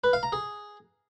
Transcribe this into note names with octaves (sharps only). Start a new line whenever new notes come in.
B4
F5
A#5
G#4